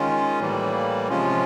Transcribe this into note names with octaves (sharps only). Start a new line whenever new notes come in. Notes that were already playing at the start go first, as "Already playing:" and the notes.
Already playing: D#3 G#3 C#4 F4
A2 E3 G3 A#3
C3 F3 G#3 C#4 F4